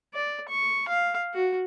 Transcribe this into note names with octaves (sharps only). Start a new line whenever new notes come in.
D5
C#6
F5
F#4